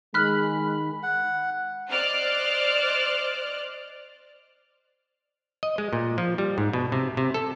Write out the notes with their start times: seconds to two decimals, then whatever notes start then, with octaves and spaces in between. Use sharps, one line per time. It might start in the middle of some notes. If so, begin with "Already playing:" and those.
0.14 D#3 G#3 B5 F6 F#6 B6
1.03 F#5
1.88 C5 D5 D#5 F6 F#6
5.63 D#5
5.78 G#3
5.93 A#2
6.18 F3
6.38 G3
6.58 G#2
6.73 B2
6.92 C3
7.17 C3
7.34 A4